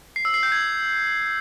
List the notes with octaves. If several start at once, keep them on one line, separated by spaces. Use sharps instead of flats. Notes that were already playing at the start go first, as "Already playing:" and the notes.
C7
E6
C7
G6
G#6